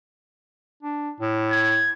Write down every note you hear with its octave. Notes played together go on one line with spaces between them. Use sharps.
D4
A2
G#6